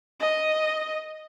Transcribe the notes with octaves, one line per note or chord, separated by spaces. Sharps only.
D#5